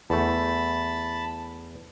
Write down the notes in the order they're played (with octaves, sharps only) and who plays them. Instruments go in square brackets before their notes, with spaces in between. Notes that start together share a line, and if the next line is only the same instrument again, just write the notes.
[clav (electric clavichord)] E2 A3 [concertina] A5 B5